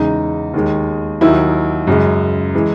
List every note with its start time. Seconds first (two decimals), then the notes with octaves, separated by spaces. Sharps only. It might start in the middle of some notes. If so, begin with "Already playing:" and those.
Already playing: E2 C#3 G#3 D#4
0.54 D#2 D#3 G#3
1.21 D#2 D#3 F#3 E4
1.87 F#2 C#3 G#3
2.55 E3 G#3